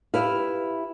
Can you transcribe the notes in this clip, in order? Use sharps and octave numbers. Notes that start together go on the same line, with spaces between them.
E4 G4 B4 F5